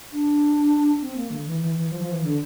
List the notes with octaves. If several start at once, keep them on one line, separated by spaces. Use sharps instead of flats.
D4
C4
A#3
D3
E3
E3
E3
F3
F3
E3
D3